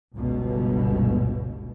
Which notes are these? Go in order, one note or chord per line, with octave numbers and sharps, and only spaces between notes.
G1 C#2 G2 B2